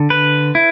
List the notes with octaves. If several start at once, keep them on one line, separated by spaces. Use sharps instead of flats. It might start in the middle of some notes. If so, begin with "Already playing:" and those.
Already playing: D3
B4
E4